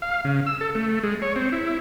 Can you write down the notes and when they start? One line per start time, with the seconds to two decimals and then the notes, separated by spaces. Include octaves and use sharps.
0.02 F5
0.25 C#3
0.46 E6
0.61 A4
0.75 A3
1.03 G#3
1.22 C#5
1.36 C4
1.52 E4